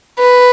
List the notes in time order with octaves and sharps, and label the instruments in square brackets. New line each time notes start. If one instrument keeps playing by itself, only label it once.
[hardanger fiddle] B4